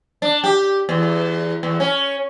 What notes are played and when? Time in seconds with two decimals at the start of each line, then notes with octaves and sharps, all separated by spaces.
0.22 D4
0.44 G4
0.89 E2
1.63 E2
1.80 C#4